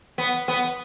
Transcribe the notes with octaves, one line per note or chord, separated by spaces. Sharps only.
B3
B3